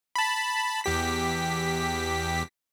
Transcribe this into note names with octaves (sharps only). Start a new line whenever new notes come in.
A5 B5
E2 G4 B6